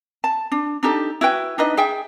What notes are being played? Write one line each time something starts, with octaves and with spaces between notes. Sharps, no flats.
A5
D4
D4 D#4 G4 A4
E4 F#4 B4 G5
D4 D#4 B4 D#5
G#4 E5 G5